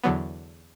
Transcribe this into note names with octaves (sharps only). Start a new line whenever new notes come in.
E2 D3 F#3 B3